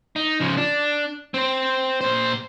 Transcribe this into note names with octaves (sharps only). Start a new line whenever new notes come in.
D#4
C#3 F3
D4
C4 C5
A#2 C5